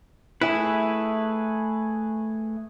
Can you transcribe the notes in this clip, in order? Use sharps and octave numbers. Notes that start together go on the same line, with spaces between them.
A3 E4 G#4 B4